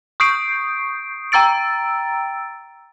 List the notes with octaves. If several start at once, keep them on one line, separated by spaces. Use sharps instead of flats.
C#6 D#6 G6 C7 D7
G5 A#5 E6 A6 D7